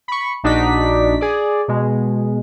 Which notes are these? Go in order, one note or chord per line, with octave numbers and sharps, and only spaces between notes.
B5 C#6
A#1 D4 D#4 F#4 D5 B6
G#4 D5
B2 G#3